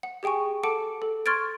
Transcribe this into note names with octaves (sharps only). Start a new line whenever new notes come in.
F#5
G4 G#4 G5 G#5 C#6
A4 F#5 A5 D6 D7
A4
C6 C#6 F6 G#6 A6 D7